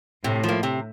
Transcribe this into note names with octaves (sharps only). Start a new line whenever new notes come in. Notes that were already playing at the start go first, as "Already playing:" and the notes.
A2 C3
F3
A#3
C3